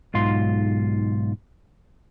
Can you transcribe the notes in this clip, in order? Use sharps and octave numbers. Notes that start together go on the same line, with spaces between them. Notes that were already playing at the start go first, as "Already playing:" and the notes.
B1 G#2 F4 C6